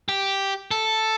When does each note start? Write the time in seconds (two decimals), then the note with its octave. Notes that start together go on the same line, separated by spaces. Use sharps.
0.09 G4
0.71 A4